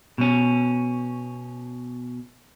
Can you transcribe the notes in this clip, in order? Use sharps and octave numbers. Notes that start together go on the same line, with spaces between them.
B2 C#4